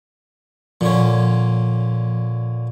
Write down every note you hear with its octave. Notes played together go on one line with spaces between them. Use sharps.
A#2 D3 F3 C#4